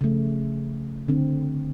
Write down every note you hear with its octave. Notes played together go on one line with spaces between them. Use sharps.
C#3 F3 A3
D3 C4